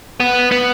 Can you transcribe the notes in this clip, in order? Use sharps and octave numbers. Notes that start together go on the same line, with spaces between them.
B3
B3